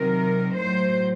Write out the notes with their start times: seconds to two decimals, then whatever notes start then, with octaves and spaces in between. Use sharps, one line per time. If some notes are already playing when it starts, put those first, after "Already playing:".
Already playing: C3 D#3 F#3 A#4
0.55 A2 F#3 C5